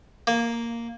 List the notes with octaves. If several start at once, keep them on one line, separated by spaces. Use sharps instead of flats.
A#3